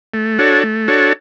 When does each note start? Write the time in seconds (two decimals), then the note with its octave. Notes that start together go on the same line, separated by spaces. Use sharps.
0.14 A3
0.38 D4 F#4 A4 C#5
0.64 A3
0.88 D4 F#4 A4 C#5